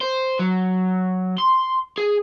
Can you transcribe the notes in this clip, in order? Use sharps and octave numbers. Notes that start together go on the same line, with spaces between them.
C5
F#3
C6
G#4